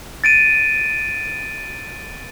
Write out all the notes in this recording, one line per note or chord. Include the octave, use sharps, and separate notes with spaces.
A6 D7 D#7